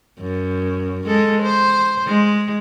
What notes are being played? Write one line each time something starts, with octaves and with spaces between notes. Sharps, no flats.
F#2
G#3 A4
C5
G#3